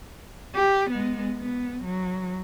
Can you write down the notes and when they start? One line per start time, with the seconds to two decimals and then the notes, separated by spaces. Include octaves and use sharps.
0.56 G4
0.91 G#3 B3
1.40 B3
1.85 F#3